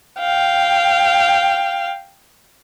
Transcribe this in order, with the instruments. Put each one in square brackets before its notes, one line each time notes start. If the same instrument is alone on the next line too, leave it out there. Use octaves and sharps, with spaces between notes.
[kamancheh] F5 G5